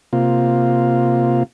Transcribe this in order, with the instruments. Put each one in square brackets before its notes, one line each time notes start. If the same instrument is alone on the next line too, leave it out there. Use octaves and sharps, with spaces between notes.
[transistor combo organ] C3 A#3 F4